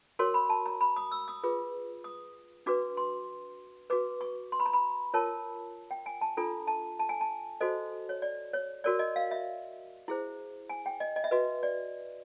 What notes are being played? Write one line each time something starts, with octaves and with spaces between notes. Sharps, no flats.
F#4 A#4 C#5 C6
B5
A5
A#5
B5
D#6
E6
D#6
F4 G#4 B4
D#6
D4 F#4 B4 D6
C6
F#4 B4 D6
C#6
C6
B5
A#5
B5
F4 A#4 C#5 A5
G5
G#5
A5
D4 F4 A4 A#5
A5
A5
G#5
A5
F#4 A4 C5 D#5
C#5
D5
C#5
F#4 A#4 C#5 D5
D#5
F5
E5
E4 G#4 C5
G#5
G5
D#5
D#5
E5
F#4 B4 D#5
D5